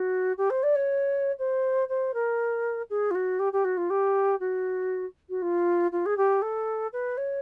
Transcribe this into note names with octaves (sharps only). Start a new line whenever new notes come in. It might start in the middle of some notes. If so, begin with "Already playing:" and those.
Already playing: F#4
G4
C5
D5
C#5
C5
C5
A#4
G#4
F4
F#4
G4
G4
F#4
F4
G4
F#4
F#4
F4
F4
G#4
G4
A4
B4
C#5